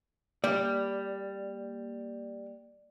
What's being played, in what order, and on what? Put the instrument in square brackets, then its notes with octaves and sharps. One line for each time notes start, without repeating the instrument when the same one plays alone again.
[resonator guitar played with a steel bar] G3 [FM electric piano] A#3 [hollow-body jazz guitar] D5